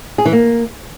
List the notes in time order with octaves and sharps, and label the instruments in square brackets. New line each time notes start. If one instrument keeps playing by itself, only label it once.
[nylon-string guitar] G#4
E3
A#3